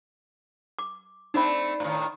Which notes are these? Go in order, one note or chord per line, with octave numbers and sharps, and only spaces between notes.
D6
A3 C4 D4 D#4 B5
A2 D#3